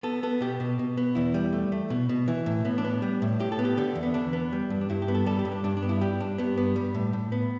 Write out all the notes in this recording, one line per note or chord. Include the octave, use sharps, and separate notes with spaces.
B3 A4
B3 A4
B2 G4
B2
B2
B3
E2 E4
G3
A3
A3
B2
B2
E3
A2
A2 B3
D4
B3
G3
A2
A2 G4
A4
B3
G4
D3 G4
E2
B3
E2 D4
B3
G3
G2
D4
G2 E4
G4
B3
A4
G3 A4
G4
G2
D4
G2 D4
D4
B3
E4
G3 G4
G2 D4
G2 B3
B3
G3
A2
A2
B3